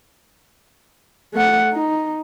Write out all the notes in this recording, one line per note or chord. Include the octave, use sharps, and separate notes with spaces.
A3 F#5
D#4